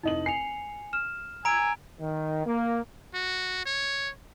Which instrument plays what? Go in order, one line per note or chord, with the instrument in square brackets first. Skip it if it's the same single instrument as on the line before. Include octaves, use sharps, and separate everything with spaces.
[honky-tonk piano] F1 D#4 F#7 [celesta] E4
[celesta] G#5 C#7 F7 [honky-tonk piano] C7
[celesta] F6 E7
[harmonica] G#5 E6 [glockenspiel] A#5 D7
[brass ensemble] D#3
A#3
[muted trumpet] F#4
C#5